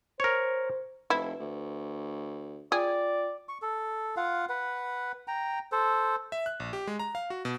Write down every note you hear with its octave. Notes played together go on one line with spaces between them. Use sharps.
A#4 C5 C#5
F1 E4 B4
D2
F4 G#4 D5 G5
C#6
A4
F4 F5 F#5
B4 F#5
G5 A#5
A4 C5
E5
F#6
A#1
G4
G#3
A#5
F5
F#4
B2